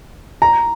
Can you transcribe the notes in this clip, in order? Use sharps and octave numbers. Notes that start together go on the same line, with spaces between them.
A#5